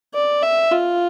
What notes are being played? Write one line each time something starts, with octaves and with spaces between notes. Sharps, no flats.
D5
E5
F4